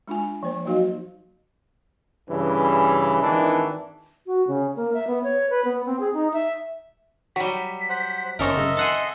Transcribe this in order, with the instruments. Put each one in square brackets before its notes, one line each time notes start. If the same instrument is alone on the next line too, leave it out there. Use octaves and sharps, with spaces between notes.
[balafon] G#3 D4 F4 G#5
F3 A#3 C5
F#3 A#3 D#4 F#4 D#5 F5
[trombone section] G2 C#3 E3
G#1 D#3 E3 D4
[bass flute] F#4
C#3
A#3
E5
B3
C#5
B4
B3
C4
G#4
D#4
E5
[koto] F#3 G3 [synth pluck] F#4 [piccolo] B6
[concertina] C5 F#5
[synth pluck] G1 C#4 C#6 [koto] C4 A4 A#4 [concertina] D#5 E5
[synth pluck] F#2 C#3
[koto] A4 F#5 G#5 [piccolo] C6